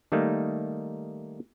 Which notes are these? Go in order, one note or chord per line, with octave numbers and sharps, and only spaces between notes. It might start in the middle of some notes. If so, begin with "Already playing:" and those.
D#3 G3 A3 A#3 D#4